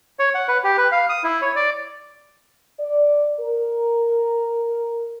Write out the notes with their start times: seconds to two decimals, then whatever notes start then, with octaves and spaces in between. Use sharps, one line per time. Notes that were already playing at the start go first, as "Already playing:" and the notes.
0.19 C#5
0.35 F#5
0.48 B4
0.64 G4
0.77 B4
0.92 F5
1.09 D#6
1.24 E4
1.42 C#5
1.56 D5
2.79 D5
3.40 A#4